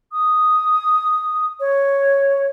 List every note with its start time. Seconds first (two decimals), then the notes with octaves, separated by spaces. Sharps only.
0.12 D#6
1.60 C#5